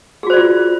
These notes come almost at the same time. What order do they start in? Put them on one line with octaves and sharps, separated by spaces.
G#4 F#4 C5 D5 F4